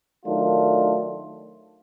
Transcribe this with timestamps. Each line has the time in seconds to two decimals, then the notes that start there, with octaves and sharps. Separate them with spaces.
0.24 D#3 F#3 A3 D4 F4